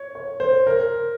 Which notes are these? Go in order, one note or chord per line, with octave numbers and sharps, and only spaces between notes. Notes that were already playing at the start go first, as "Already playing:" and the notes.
Already playing: C#5
C#5
C5
A#4